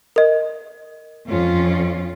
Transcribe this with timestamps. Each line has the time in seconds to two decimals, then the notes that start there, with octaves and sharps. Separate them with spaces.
0.16 A#4 D#5
1.28 F2 C#4 F4